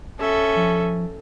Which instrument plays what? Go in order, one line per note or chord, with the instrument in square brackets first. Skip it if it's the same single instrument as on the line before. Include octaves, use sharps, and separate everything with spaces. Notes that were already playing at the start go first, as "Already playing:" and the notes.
[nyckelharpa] C#4 E5 [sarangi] A4
[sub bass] F3